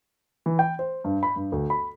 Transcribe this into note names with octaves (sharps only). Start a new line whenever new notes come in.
E3
G5
C5
G2
B5
G2
D2
B5